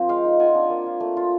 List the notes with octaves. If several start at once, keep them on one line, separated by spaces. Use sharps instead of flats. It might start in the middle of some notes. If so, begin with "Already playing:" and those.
Already playing: F3 A#3 C4 A#4
G#3 F5 G5
D#4
F4 F#5 G#5
D4
A#3
F4
A3
F4